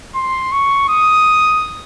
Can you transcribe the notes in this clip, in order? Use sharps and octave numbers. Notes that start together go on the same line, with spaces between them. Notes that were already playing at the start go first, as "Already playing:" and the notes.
C6
C#6
D#6